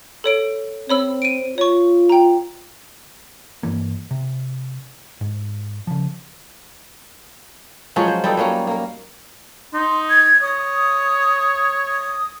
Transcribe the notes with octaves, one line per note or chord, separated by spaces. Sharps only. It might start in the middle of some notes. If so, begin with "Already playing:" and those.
A4 C#5 D7
C4 C#5 B5 E6
D7 D#7
F4 C#5 C#6
G5 A#5
G2 E3 A#3
C3
G#2
C#3 F3
F3 F#3 G#3 C#4
C5
G3 B3 D#4 A4
F#3 G3 A#3 C#4
A#3 A#4
D#4 C6
G#6
C#5 D#6
D#6